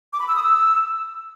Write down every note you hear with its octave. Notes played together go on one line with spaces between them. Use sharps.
D6
B5
E6
D#6
E6